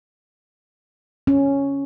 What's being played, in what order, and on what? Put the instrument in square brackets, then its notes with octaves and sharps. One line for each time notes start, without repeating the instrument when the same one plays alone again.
[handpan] C#4